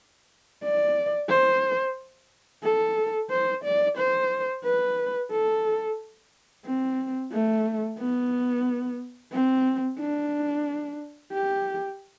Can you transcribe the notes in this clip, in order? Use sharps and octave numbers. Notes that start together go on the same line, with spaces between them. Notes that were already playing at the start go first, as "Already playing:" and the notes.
D5
C5
A4
C5
D5
C5
B4
A4
C4
A3
B3
C4
D4
G4